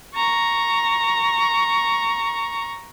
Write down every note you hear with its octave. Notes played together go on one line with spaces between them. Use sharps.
A#5 C#6